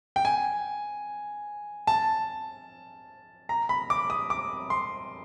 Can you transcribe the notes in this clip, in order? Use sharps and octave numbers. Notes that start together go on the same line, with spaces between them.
G5
G#5
A5
A#5
B5
D6
D#6
D6
C6